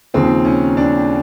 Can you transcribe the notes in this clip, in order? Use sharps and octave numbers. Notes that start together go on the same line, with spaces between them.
D#2 C#3 F3 C4
C#4
D4